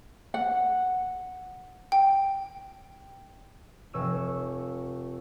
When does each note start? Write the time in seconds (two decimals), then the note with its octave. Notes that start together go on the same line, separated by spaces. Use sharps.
0.34 F#5
1.92 G5
3.93 F1 C#5 E6 D#7 E7